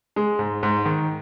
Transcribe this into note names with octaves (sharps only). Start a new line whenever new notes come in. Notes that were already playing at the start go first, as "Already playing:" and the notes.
G#3
G#2
G#2
D#3